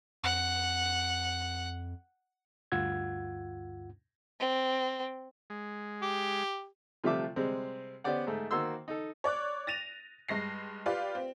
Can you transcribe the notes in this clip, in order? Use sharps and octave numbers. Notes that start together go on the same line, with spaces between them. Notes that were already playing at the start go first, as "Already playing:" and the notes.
F2 F#5
D2 G2 F4 F#5 E6 G#6
C4
G#3
G4
C3 F3 G3 A3 E5 D6
C3 G3 G#3 C4
B3 C#4 G4 C5 D5 F#5
G#2 A3
D#3 A#3 F#4 C5 C6 E6
D#4 A4
C#5 D5 D6 F#6
A6 A#6 D#7 F7
G2 G#3 A#6 C7
F4 G4 B4 D5 F5
C4